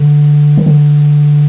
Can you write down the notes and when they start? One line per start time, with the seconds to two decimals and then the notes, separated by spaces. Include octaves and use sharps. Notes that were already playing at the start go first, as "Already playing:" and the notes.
Already playing: D3
0.57 D#3
0.66 D3